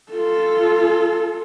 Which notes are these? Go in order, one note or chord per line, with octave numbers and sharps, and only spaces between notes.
F4 A4